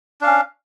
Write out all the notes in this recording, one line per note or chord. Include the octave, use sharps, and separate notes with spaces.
C#4 D4 F5